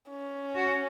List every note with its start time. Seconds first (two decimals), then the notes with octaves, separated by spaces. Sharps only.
0.10 C#4
0.56 F#4